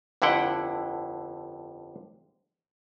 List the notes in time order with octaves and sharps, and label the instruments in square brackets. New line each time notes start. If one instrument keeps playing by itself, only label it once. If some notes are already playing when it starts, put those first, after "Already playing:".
[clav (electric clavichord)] G1 F2 D3 E4 F#5 G5